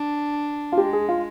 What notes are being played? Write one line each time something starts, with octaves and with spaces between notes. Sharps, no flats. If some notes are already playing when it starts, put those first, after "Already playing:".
Already playing: D4
F4
G#3 G4
G#4
F4